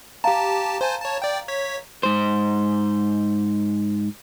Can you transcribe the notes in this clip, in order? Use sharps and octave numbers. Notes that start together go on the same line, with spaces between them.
G4 F5 A5 A#5
C5 G#5 A5
C#5 A5
D5 G5
C#5 B6
G#2 C5